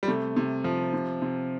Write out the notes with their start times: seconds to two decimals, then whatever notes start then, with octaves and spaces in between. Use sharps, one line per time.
0.03 G3
0.08 C3 A3
0.36 C3
0.64 F3
0.93 C3
1.22 C3